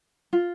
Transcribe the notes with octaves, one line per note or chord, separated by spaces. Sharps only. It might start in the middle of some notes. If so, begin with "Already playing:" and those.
F4